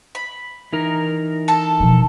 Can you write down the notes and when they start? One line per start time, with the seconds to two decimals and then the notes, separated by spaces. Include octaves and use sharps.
0.15 B5
0.72 E3 D#4 A#4
1.48 A4 A5
1.80 B2 F3